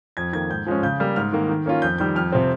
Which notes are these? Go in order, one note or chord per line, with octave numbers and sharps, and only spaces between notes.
F2 G#6
D#3 A#3 G#6
G#2 G6
F3 G#3 C#4
C#3 G6
G3 A#3
G#2 F6
D#3 A#3
D#3
A#3 C#4 F4
F2 G6
D#3 G3 G6
F2 F6
C3 F3 C4